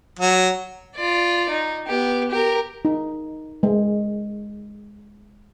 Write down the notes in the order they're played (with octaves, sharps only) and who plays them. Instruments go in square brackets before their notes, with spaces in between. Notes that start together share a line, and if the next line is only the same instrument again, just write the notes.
[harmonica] F#3
[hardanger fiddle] F4 D5
D#4
B3 G4
G4 A#4
[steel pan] D#4
G#3